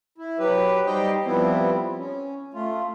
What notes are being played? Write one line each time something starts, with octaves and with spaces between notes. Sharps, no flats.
E4
F#3 G4 B4
G3 D#4 G4 C5 D#5 G5
F3 G3 B3 C4 E4
C#4
A3 F4